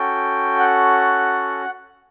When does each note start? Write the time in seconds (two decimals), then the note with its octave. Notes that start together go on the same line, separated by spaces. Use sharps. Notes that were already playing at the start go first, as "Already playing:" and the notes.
Already playing: C#4 F#4 A4 G5
0.59 F#5